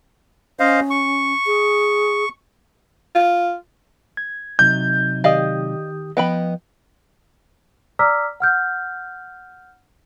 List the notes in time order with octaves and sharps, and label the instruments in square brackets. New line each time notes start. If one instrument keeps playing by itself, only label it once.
[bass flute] C#4 [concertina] C5 D#5 F5
[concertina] C#6
[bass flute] G#4
[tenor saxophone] F4
[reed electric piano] G#6
[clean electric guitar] C3 F#3 D#4 [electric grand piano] G6
[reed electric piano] D#3 G4 D#6 [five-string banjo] D5 D#5 F5
[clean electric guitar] F3 D#5 [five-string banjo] B3 G5 B5
[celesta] D5 A#5 D6 E6 F6 B6
F#5 F6 G6